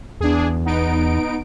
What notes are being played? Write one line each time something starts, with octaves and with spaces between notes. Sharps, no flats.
E2 D4 G#4
B3 D#4 D7